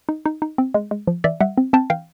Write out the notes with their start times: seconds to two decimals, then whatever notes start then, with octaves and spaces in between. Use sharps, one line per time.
0.09 D#4
0.26 D#4
0.42 D#4
0.58 C4
0.74 G#3
0.91 G#3
1.07 F3
1.24 E3 D5 E5
1.40 G3 E5 F#5
1.57 C4
1.73 C4 G5 A5
1.90 E3 F5 G5